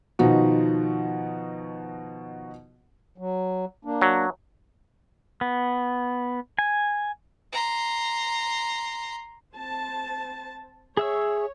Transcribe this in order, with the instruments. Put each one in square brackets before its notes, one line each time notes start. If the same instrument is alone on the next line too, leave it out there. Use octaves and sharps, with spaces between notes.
[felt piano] B2 D#3 F3 D#4 F#4
[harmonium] F#3
A#3 D4
[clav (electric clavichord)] F#3
[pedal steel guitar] B3
G#5
[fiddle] A#5 C6
[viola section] C4 C5 A5
[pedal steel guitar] G#4 E5 E6 [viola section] C#5